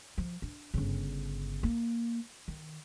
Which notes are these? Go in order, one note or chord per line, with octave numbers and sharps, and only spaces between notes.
F3
D4
G1 C#3
A#3
D#3